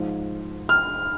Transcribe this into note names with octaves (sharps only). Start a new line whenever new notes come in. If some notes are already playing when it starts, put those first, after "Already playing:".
Already playing: G#2 F3
F6